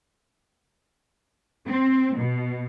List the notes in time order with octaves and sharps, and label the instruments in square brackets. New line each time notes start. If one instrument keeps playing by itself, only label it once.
[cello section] C4
B2